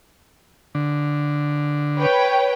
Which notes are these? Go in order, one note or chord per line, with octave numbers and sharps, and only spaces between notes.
D3
B4 C#5 G5